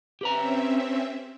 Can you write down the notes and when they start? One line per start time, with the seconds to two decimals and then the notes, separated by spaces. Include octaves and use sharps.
0.21 C4 C#4 G4 B4 E5 A#5